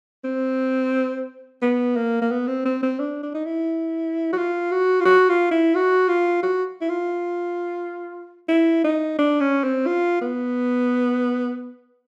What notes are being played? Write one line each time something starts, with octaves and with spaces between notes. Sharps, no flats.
C4
B3
A#3
A#3
B3
C4
C4
C4
D4
D4
D#4
E4
F#4
F4
F#4
F4
F#4
F4
E4
F#4
F4
F#4
E4
F4
E4
D#4
D4
C#4
C4
F4
B3